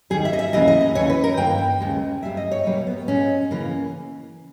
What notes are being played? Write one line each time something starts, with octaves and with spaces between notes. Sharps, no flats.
D#2 D#3 G3 G#4
E5
D#5
E5
D#2 C#3 E3 A#3 D#5
D#5
D#5
D#2 C#3 E3 C#5
B4
A#4
G2 D#3 A#3 G5
D#2 C#3 G#3
G2 G3 A#3 E5
D#5
C#5
E2 B2 G3 A#3
B3
A#2 G#3 C#4
C#3 E3 A#3